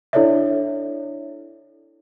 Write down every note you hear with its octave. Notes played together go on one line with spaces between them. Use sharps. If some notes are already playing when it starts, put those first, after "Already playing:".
D4 E4 A4 C#5 D5 E5